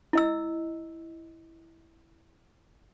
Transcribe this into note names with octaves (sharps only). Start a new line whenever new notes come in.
E4 D#5 E6